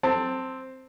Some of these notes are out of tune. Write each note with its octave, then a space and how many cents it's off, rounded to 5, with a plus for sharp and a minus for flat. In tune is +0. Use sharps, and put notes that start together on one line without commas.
C4 +0 A5 +20